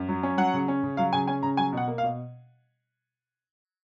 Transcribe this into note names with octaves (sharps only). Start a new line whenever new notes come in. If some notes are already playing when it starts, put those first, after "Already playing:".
Already playing: F#2
F#3
C#4
F#3 F#5
C#3
C#4
C#3
F#3 F5
C#3 G#5
C#4 G#5
C#3 A#5
F#3 G#5
B2 F#5
A#3
F5
B2